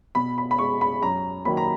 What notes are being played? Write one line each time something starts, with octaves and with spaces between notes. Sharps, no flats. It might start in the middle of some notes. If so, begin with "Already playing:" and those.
B2 B5
B5
B5
G#3 C#6
B5
F#2 A#5
D#3 F#3 A#3 B5
A#5